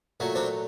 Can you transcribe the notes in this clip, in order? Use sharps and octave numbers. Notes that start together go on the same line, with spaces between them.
A#2 F#3 A3
C4 D4